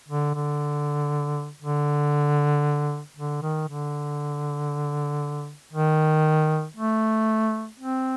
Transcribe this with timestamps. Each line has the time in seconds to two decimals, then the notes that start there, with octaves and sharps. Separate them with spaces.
0.08 D3
0.34 D3
1.62 D3
3.17 D3
3.42 D#3
3.68 D3
5.73 D#3
6.77 A3
7.79 C4